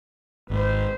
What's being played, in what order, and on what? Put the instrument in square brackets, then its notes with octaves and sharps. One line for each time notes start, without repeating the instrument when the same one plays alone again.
[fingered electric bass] G#1 [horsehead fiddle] B4 C5